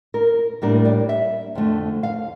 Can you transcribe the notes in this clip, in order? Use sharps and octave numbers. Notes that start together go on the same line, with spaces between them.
A#4
A2 G3 A#3 D4 A#4
D5
E5
F2 D3 A3
F5